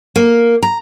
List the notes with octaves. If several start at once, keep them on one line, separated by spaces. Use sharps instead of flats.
A#3
A#5